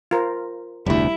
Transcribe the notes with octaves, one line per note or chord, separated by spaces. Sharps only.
F4 A#4 C5
F1 D2 G3 E4